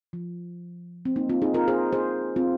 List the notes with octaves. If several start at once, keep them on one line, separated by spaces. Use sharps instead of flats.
F3
C4
A#3 D#4
C4 F4
D#4 G#4
F4 A#4
G#4 C5
G#4 C5
C4 F4